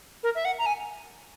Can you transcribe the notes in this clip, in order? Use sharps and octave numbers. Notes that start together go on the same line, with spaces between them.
A#4
E5
F#5
A#5
G#5